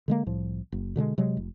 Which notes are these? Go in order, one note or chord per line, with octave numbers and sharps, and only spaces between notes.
D3 G#3 A#3
C2 A2 F3
F#1
B2 D3 G3 G#3
C3 F#3 G#3
F1